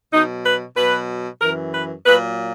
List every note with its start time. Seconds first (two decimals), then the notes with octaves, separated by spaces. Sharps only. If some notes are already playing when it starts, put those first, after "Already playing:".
0.13 B2 F#3 D#4
0.45 B4
0.76 B2 F#3 B4
1.41 F#2 E3 A#4
1.74 B4
2.06 A#2 F#3 B4